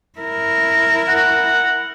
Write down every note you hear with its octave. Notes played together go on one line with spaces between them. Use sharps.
E4 A#4
F#5